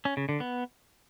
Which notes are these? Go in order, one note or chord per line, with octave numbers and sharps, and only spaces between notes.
C#4
C#3
D3
B3